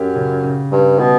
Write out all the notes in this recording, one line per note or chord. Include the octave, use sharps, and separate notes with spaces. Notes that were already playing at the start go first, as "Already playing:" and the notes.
Already playing: F#2 G4
C#3
C#3
G2 G3
B2 F#4